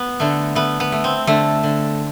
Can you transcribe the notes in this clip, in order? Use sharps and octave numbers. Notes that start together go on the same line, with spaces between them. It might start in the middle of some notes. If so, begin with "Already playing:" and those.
Already playing: B3
D3 A3
A3 B3
B3
A3
C4
D3 A3
D3